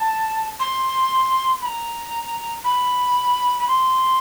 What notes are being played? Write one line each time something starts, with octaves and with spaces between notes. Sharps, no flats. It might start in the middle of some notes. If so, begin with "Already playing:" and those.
Already playing: A5
C6
B5
A#5
B5
B5
C6